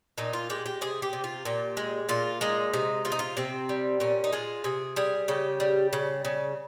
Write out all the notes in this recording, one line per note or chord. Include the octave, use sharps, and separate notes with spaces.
A#2 D#4
F4
G#3 G4
G4
C3 G#4
G4
C3
F4
A#2 G4
G#3
A#2 F4
G#3 D#4
C3 D#4
C3 F4
D#4
F4
C3 C4
G3
A#2 C#4
D#4
G#3 F4
C3 G#4
G3 G#4
C#3 G4
G3
C#3
C#3